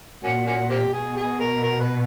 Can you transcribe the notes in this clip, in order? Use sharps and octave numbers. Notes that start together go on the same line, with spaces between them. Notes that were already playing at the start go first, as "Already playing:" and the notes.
A#2 A#3 C#4 F#4
A#3 C#4 F#4
A#3 C4 G4
B2 G#4
G#4
A#4
A#4
B4